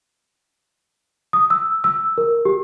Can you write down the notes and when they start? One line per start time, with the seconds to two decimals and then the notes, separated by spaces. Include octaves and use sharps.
1.33 D#6
1.50 E6
1.84 E6
2.18 A#4
2.45 G4